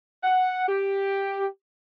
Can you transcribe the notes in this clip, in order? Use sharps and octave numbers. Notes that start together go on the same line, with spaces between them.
F#5
G4